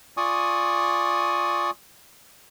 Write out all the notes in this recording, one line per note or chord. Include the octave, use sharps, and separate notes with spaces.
F4 D5 G#5 C#6 D#6